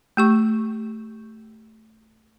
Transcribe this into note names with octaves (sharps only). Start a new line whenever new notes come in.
A3 G4 C#6